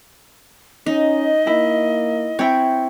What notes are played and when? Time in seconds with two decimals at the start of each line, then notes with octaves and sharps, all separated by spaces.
0.86 C#4 D#4 D#5
1.47 A#3 E4
2.39 C4 E4 C#5 G5